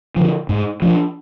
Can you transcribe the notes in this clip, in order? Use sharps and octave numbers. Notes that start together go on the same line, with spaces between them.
D3 F3
G#2
F3 B3 D4